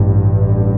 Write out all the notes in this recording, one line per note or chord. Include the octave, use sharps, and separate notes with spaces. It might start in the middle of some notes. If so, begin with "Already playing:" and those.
Already playing: A1 G2